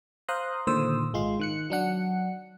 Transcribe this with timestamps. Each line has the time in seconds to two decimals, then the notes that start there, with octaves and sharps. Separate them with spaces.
0.28 C5 F5 A#5 C6 D#6 F#6
0.67 A#2 D3 D#3 C5 D#6 E6
1.13 G#1 G#3 F4 C6
1.40 D#3 F#6 C#7
1.70 F#3 D4 F#5 C#7